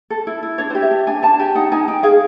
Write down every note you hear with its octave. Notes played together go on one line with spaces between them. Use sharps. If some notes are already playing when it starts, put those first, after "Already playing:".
A4
E4
E4
D4 C#5
C5
G4
E5
D4
D4 G#5
D4 A5
G4 G#5
D#4 F#5
D#4 G#5
D#4 G5
G#4 F5